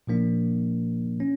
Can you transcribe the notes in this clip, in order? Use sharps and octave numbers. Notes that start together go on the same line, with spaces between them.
A#2 F3 A#3 D4
C#4